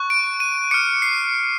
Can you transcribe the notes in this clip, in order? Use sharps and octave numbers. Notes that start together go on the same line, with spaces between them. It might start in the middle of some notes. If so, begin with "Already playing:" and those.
Already playing: C#6 F#6
D7
D#7
D6 F6 C#7
C7